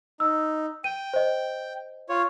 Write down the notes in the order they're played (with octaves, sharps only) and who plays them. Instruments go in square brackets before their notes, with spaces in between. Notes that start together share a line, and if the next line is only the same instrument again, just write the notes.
[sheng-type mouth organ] D#4 [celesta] E6
[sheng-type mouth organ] G5 [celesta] D#7
[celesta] C5 D#5
[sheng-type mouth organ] F4 C#5